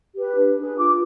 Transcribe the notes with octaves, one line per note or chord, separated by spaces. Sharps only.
G4 B4
D4
G#4 B4
F4 D6